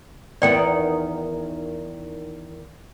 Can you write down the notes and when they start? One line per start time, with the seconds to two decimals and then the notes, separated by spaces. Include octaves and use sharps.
0.42 E2 D#3 B3 D5 G5